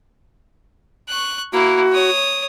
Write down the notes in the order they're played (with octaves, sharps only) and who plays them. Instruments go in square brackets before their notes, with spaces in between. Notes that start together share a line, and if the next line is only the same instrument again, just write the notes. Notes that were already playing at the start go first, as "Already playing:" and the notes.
[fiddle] C#6 F#6
[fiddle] A#3 E4 [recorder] F#4
[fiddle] C#5 D#6